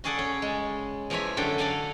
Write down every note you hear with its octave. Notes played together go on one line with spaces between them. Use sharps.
C#3 C#4 G#4 A4 D5 F#5
C#4
G#3
E2 F3 A#4 C#5 E5 G#5
F#2 D3 D4 A4 G5
A4 A#4 D5 F5 F#5 G#5